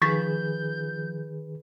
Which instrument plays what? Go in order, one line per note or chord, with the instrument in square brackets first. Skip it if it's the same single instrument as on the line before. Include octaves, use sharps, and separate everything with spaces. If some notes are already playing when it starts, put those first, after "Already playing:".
[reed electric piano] D#3 G#4 B4 [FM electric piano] F3 [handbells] C#6 A6 B6 [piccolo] G6